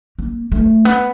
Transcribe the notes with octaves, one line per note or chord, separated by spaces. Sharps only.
A#3
A3
B3